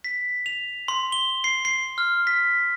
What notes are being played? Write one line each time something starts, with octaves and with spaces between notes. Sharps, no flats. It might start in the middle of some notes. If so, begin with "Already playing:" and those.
B6
F7
C6
G7
C7
C7
F6
B6